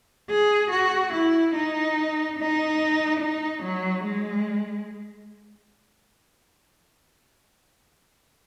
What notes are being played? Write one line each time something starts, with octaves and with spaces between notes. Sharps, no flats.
G#4
F#4
E4
D#4
D#4
D#4
F#3
G#3